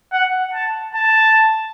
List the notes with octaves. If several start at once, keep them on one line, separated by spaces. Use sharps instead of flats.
F#5
A5
A5